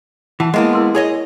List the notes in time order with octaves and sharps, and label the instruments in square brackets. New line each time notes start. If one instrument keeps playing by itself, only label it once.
[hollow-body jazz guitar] E3 [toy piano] F#5 A5
[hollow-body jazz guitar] G#3 A#3 B3 [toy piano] E4 D#5
[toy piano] E4 A#4 C6
[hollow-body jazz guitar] G#4 C#5 D#5